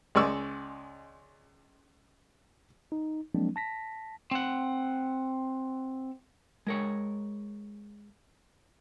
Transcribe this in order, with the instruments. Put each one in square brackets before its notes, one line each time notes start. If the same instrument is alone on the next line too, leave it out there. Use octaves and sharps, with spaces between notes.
[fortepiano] C#2 G#3 D5 G#5 C#6 E6
[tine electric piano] D#4
F3 F#3 G#3 A#3 C4 D4
A5 A#6 B6
[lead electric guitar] C4 F#5
[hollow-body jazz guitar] G#3 A#4 C#5